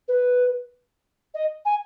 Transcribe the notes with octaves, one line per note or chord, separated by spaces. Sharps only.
B4
D#5
G#5